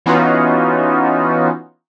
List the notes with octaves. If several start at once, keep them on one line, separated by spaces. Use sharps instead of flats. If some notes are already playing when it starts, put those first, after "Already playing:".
E3 B3 C#4 D#4 F4 F#4